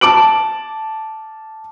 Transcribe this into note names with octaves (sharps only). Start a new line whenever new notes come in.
A5 D6 D7 F#7